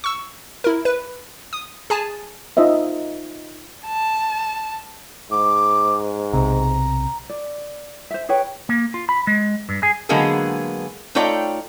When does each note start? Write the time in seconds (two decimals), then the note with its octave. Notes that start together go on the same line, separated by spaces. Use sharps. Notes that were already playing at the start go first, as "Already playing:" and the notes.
0.04 C#6 E6
0.64 E4 A#4
0.85 B4
1.53 D#6
1.90 G#4 G#5 A5
2.57 D#4 F4 C5 D#5 E5
3.87 A5
5.31 G#2 D6
6.33 B1 C3 A#5
7.29 D5
8.11 C5 E5
8.29 G#4 B4 C#5 G5
8.69 A#3
8.94 F4
9.09 B5
9.27 G#3
9.69 G2
9.83 G#4
10.09 D3 F#3 G#3 A#3 B3 G#4
11.15 A3 D#4 F4 C#5 D5 G5